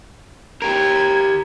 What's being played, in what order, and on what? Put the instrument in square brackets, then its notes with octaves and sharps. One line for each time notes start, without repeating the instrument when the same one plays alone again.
[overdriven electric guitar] G4 A#4 [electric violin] G#6